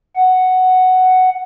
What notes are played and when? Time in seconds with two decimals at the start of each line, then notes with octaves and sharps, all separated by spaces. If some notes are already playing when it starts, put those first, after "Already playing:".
0.16 F#5